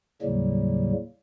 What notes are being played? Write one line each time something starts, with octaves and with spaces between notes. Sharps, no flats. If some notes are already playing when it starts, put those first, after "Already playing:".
D#2 A2 C#3 F#3 G3 A#3